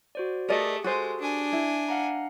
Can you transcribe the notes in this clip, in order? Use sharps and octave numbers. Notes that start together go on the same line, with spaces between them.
F#4 C5 D5
A3 G4 G#4 A#4 D5 D#5
G#3 F#4 A4 C5
D4 G#5
E4
F5 F#5 A#5